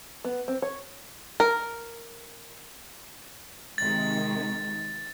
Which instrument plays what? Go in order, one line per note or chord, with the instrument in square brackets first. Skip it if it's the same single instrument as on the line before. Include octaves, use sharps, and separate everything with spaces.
[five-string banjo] B3
C4
C#5
A#4
[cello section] C3 D#3 G#3 [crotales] A6